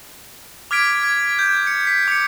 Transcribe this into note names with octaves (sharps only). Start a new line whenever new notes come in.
D6 F6 G#6 B6 D7
G#6
G6
C#7
B6
D6 C#7